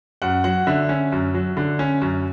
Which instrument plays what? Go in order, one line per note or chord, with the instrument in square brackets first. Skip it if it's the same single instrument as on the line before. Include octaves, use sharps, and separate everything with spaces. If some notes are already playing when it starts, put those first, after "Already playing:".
[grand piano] F#2 F#5
F#3 F#5
D3 E5
C#4
F#2
F#3
D3
C#4
F#2